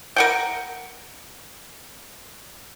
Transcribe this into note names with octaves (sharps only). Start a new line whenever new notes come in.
A#4 F#5 G5